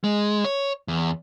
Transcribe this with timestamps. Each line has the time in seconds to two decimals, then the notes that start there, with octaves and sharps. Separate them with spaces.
0.04 G#3
0.45 C#5
0.88 E2